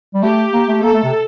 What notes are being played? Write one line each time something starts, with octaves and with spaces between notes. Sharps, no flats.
G3
A3 G4
A#3
A3
A#3 A4
A3
C3